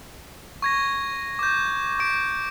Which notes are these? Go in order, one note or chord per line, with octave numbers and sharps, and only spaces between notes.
C#6 G#6 A#6
D6 G6
D6 D7